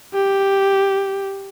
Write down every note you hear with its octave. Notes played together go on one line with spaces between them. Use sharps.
G4